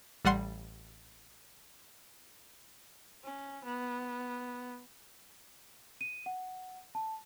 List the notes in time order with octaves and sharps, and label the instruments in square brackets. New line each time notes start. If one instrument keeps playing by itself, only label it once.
[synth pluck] A1 G3 F#5 C6
[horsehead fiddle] C#4
B3
[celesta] D#7
F#5
A5